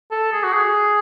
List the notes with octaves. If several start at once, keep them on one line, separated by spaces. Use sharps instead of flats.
A4
G#4
F#4
G#4